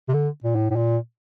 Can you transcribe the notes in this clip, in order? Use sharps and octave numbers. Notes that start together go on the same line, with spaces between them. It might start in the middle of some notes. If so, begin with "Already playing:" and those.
C3
D3
A#2
A2
A2
A#2